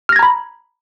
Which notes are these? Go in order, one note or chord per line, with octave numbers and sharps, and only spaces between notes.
A#5 B5 F6 G#6 A#6